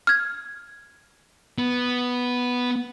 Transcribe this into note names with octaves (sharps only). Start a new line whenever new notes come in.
F6 G#6
B3